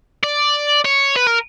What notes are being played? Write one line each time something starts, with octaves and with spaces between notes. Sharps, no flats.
D5
C#5
B4
A#4